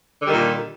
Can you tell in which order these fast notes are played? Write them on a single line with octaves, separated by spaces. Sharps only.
D3 G3 D#3 A#2